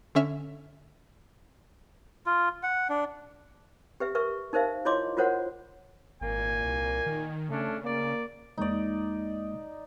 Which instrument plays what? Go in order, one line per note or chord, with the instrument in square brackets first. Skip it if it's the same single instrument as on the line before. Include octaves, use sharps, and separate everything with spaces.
[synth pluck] D3 C#4 E5 F6
[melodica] F4
F#5
D4
[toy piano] G4 B4 E5
A#4 B4 E5 C#6
D#4 A#4 C5 E5 F5
E4 F4 C#5 D#5 C6 D6
F4 F#4 A#4 C5 C#5 F#5
[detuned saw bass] G#1 [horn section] A#2 A#3 G#5
[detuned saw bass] C2
D#3
[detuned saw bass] C#3 [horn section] A3 C#4 D4
[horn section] A#3 D5
[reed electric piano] E2 G#3 A#3 [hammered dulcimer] D#4 D5